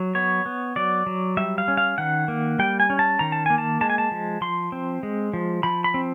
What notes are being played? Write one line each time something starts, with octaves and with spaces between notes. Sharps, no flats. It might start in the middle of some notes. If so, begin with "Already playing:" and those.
Already playing: F#3
B3 C#5
B3
F#3 D5
F#3
G3 E5
F5
C#4
F5
D#3 F#5
A#3
G3 G5
G#5
C#4
A5
D#3 A#5
A5
A#3 G#5
A5
G#3 A5
G#5
A5
F3
F3 C6
C4
G#3
F3
F3 B5
B5
C4